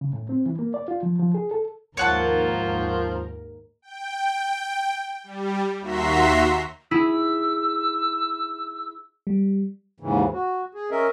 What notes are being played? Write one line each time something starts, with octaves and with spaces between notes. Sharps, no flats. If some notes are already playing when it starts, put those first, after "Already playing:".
C#3
A2
C4
E3
A#3
D5
F4
F3
F3
G#4
A4
D#2 G#2 F3 A#4 C#5 F#5 A5
G5
G3
D#2 F#4 E5 A#5 C6 B6
E4 G#4 E6
G3
D#2 G#2 C#3 E3
F#4
G#4
C#4 A#4 D#5 E5